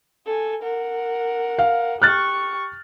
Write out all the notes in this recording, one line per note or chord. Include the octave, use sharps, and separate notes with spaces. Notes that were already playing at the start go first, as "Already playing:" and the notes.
A4 G#5
A#4 F#5
F5
G4 C#6 F6 F#6 A6